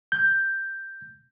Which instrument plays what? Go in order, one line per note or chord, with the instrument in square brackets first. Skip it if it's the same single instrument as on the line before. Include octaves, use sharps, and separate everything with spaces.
[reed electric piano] G6